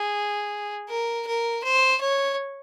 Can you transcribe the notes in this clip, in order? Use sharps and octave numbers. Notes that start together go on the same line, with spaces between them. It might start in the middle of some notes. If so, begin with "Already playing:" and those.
Already playing: G#4
A#4
A#4
C5
C#5